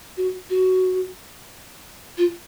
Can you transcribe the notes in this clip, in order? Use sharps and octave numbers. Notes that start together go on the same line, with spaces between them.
F#4
F#4
F4